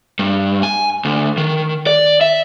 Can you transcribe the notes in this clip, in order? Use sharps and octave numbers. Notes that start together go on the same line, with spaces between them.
G2
G#5
D2
D#3
D5
E5